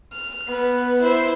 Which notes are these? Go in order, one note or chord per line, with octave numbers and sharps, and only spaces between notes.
F6
B3 B4
E4 C5